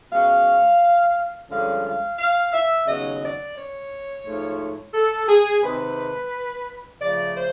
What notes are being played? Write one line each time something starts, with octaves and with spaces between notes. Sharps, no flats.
B2 G#3 C#4 F5
G2 D3 F3 G#3 C#4 F5
F5
F5
E5
D#2 C#3 F#3 B3 D#5
D5
C#5
G#2 F3 A3
A4
G#4
C3 D#3 G#3 C4 B4
C#3 F3 A3 D5
C5